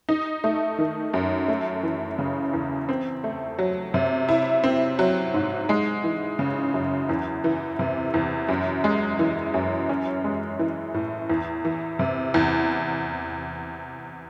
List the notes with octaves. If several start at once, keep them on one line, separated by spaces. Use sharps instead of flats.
D#4
A3
D#3
F#2
A3
E3
C#3
E2
C4
A3
F#3
C3
E4
C4
F#3
G#2
G#3
E3
C#3
F#2
E2
E3
C3
E2
F#2
G#3
E3
F#2
C#4
G#3
E3
A2
E2
E3
C3
E2